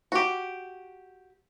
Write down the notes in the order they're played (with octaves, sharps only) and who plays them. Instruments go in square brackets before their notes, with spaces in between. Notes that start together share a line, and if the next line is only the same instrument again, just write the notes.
[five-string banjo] F#4 G4